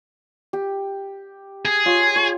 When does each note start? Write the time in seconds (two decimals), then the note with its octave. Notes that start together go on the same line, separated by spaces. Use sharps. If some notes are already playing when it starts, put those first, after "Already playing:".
0.53 G4
1.65 G#4
1.86 F4 C#5 D#5
2.16 C#5